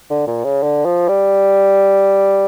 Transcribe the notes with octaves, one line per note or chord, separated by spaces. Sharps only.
D3
A#2
C#3
D3
F3
G3